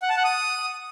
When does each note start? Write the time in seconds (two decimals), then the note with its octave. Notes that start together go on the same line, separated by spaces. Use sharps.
0.02 F#5
0.10 A5
0.17 F#5
0.24 D#6